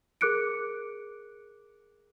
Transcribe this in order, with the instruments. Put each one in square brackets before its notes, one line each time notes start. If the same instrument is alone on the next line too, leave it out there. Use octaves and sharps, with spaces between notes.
[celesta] G#4 A#4 D6 F#6 C#7 D7